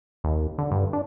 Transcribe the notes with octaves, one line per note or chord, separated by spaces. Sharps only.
D#2
D3
G2
D4